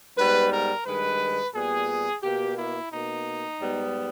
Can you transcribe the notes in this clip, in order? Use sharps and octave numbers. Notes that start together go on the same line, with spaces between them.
G#2 G3 B3 B4
A#4
G2 D#3 G#3 B4
A#2 G3 B3 G#4
B2 A#3 G4
E4
B2 A#3 D#4
G#2 G3 B3